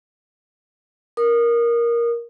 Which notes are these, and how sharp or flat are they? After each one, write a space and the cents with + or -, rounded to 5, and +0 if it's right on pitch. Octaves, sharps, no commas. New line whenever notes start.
A#4 +10 D#6 -25